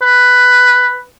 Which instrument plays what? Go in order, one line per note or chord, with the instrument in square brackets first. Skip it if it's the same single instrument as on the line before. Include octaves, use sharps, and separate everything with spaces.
[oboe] B4